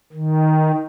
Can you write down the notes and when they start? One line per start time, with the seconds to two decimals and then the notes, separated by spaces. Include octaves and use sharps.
0.13 D#3